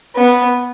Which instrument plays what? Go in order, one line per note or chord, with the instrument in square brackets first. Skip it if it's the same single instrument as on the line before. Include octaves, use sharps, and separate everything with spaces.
[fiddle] B3